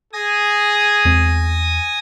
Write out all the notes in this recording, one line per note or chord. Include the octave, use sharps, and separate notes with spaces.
G#4 G#5 D#6 A#6
E2 G#3 C4